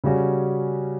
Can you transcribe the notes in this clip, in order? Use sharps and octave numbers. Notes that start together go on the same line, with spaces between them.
C#3 G3 C#4 F#4